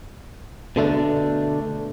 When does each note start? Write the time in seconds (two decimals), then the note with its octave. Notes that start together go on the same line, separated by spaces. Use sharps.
0.76 B2 D3 A3 D4